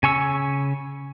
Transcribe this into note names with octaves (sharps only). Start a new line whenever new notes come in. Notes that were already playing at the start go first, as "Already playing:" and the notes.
C#3 G#5 C#6 E6